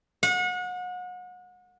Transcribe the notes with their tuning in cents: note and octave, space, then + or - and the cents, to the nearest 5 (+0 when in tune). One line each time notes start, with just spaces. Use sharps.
F#5 -35